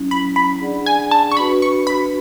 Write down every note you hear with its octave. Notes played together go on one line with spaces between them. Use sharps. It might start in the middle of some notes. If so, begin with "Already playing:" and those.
Already playing: F#3 C#4 E4
B5
B5
D4 G#4 D5 F#5
G#5
A5
C#6
D4 F#4 B4 B5
C#6
B5